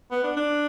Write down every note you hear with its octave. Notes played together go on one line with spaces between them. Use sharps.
B3
D4
D4